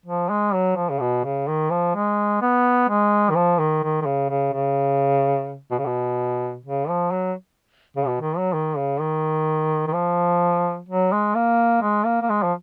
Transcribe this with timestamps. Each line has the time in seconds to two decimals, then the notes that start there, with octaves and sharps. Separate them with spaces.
0.06 F3
0.29 G#3
0.54 F#3
0.76 F3
0.90 C#3
1.00 B2
1.24 C#3
1.48 D#3
1.71 F3
1.95 G#3
2.42 B3
2.89 G#3
3.30 D#3
3.36 F3
3.59 D#3
3.83 D#3
4.01 D#3
4.06 C#3
4.30 C#3
4.53 C#3
5.71 B2
5.79 C#3
5.86 B2
6.66 C#3
6.89 F3
7.11 F#3
7.97 C#3
8.07 B2
8.21 D#3
8.37 F#3
8.53 D#3
8.77 C#3
9.00 D#3
9.87 D#3
9.94 F3
10.89 F#3
11.12 G#3
11.35 A#3
11.82 G#3
12.05 A#3
12.22 A#3
12.29 G#3
12.43 F3